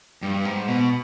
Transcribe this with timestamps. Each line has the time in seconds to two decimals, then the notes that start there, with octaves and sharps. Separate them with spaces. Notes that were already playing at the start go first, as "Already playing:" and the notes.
0.22 G2
0.45 G#2
0.68 B2